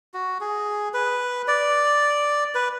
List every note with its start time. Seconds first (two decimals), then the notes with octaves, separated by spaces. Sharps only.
0.14 F#4
0.41 G#4
0.94 B4
1.48 D5
2.55 B4